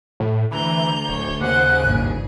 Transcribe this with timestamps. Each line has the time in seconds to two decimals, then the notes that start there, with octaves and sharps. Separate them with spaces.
0.20 A2
0.51 D2 E3 A#5 G6
1.09 D1 C#5
1.41 D#2 C#3 G#4 C5 F#5 F#6
1.84 G#1 G2 A#2